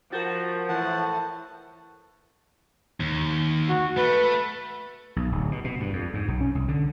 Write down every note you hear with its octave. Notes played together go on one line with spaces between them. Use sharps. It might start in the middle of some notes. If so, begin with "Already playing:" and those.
F3 F#4 A#4 G6 A6
A2 E3 F#5 A5
D#2
F#4
A3 B4
B1
D1
B2
B2
G2
F2
G#2
B1
C#4
C2
D3